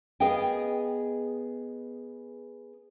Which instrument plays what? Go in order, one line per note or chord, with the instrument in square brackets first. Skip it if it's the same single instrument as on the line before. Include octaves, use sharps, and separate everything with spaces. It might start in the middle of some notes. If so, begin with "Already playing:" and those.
[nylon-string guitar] B3 G#4 D#5 F5 G5